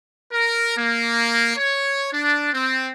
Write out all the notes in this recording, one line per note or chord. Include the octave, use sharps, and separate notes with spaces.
A#4
A#3
C#5
D4
C4